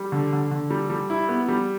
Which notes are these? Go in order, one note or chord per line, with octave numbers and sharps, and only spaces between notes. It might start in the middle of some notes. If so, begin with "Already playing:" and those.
Already playing: G3
D3
D3
D3
G3
G3
E4
B3
G3